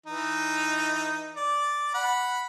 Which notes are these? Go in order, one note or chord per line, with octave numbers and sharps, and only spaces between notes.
E3 D#4
D5
F#5 B5